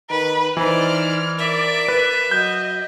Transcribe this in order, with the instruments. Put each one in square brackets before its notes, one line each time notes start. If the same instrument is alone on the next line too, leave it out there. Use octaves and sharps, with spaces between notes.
[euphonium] D#3 [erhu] B4
[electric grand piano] E3 [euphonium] D#4 [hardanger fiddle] C5 D5 [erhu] F6
[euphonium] A#4 [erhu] D5 [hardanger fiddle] E5
[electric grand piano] B4
[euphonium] F#3 [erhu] D#5 [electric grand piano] G6